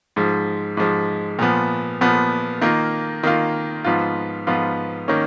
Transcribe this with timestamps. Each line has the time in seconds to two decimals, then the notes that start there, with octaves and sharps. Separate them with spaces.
0.16 G#2 F3 G#3
0.77 G#2 F3 G#3
1.39 A#2 F3 B3
2.01 A#2 F3 B3
2.62 D#3 A#3 F4
3.24 D#3 A#3 F4
3.85 G#2 F3 B3 F4
4.47 G#2 F3 B3 F4
5.08 D#3 A#3 C#4